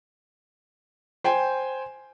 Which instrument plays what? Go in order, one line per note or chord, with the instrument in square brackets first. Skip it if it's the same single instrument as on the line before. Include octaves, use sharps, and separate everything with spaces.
[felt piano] C5 G5 G#5 C6